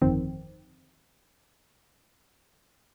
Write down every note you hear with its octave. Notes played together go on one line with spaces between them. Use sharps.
G1 F2 D#3 C4